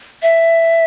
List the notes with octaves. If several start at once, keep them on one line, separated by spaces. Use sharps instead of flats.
E5